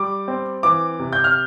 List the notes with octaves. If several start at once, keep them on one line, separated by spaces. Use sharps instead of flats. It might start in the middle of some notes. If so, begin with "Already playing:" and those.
Already playing: G3 D6
C4
E3 D6
C3
G6
F6